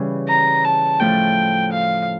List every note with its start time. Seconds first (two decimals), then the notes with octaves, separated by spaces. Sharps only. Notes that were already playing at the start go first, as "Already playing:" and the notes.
Already playing: C#3 E3 G3 C#4
0.28 A#5
0.64 A5
1.00 A2 F3 A3 G5
1.72 F5